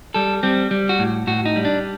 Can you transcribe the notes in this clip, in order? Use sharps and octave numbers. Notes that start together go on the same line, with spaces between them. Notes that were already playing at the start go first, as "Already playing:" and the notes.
G3 A4
G3 C4
G3
F#4
A2
A2 F#4
D#4
G3
D4